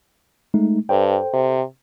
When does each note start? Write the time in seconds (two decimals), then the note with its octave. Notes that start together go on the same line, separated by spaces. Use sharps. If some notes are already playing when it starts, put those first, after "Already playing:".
0.54 G#3 A3 D#4
0.89 G2 A4 C5 G5
1.33 C3